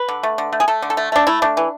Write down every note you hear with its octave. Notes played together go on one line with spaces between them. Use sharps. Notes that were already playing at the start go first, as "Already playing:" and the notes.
Already playing: B4
D3
A3
D3
A3
G#4
A3 A4
D3
A4
A3
A3 D4
A3 E4
A3 D4
E3